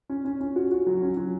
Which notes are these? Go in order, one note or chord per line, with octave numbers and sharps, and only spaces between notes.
C#4
C#4
C#4
F#4
F#4
F#3
C#4
F#3